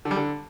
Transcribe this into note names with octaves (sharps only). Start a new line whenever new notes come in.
D3
G3
D3